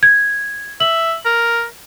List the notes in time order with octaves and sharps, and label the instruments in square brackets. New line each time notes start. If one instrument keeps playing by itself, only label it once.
[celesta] G#6
[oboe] E5 [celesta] F#7
[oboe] A#4